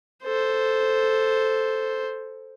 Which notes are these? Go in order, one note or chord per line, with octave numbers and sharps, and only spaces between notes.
A4 C5